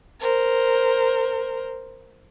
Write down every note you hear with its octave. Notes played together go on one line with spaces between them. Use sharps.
A#4 C5